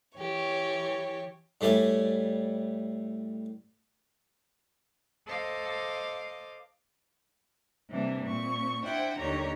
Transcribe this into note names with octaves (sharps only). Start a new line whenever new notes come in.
E3 G4 C#5
A2 G3 A3 G#5
A4 C5 D#5 F5 D6
C3 E3 G3 A#3 D4
A#2 C4 C#6
D4 E4 C5 F#5 G5
D#2 D3 D#3 G4 C#5 A#5